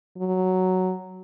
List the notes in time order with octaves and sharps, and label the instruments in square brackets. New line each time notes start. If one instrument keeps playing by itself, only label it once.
[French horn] F#3